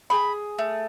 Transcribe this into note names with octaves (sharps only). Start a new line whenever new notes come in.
G#4 B5
A3